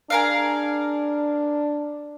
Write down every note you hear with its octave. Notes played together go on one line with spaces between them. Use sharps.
D4 G#4 A#4 F5